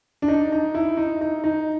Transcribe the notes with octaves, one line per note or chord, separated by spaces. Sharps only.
D4
D#4
D#4
E4
D#4
D#4
D#4